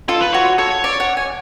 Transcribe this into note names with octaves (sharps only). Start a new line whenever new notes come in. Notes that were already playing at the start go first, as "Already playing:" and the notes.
F4 A4
B4
F#4 C#5
A4 C#5
D5
F#5
G#5